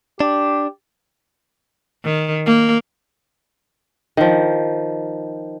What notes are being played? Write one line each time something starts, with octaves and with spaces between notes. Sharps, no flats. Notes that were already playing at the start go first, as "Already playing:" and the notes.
D4 G4
D#3
A#3
D#3 F3